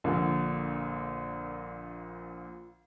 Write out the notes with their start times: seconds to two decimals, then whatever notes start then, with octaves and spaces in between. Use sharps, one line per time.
0.04 A#1 A#2 D3